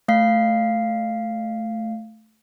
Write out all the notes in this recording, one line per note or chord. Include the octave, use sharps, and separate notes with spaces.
A3 F5 C7